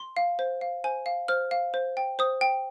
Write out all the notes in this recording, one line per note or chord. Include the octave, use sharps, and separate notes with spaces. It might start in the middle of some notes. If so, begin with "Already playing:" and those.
Already playing: C6
F5
C5
F5
C5 G#5
F5
C5 F6
F5
C5
G5
C5 D#6
G5